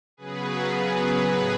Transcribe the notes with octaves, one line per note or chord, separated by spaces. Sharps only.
C#3 F#3 B3 G#4 B4
G#4 B4
A2 F#3 B3 G#4 B4